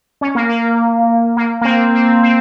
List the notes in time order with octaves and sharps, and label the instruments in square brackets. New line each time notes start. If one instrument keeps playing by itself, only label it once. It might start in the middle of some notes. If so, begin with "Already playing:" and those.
[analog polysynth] C#4
A#3
A#3
A#3
A#3
C4
C4
C4